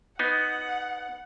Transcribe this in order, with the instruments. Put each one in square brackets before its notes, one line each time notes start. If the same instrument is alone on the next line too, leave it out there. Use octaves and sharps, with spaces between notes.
[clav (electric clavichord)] B3 D#4 [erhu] F#5